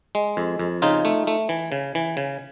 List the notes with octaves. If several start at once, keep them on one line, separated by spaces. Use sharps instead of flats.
G#3
F2
F2
C#3 D#4 F4
A3
A3
E3
C#3
E3
C#3